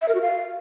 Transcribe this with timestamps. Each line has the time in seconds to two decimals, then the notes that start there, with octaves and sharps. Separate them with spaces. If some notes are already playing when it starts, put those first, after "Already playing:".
0.02 E5
0.08 A#4
0.15 F#4
0.21 F5